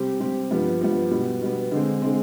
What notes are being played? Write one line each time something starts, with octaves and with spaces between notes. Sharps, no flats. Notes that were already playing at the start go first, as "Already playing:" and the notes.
Already playing: C3 G3 C4 G4
C3 G3 C4 G4
G2 F3 B3
G2 F3 B3
B2 G3 B3
B2 G3 B3
D3 G#3 C4
D3 G#3 C4